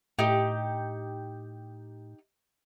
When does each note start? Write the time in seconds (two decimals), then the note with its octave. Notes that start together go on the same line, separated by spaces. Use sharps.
0.19 A2 D#4 G4